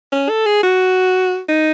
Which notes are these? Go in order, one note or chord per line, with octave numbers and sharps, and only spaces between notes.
C#4
A4
G#4
F#4
D#4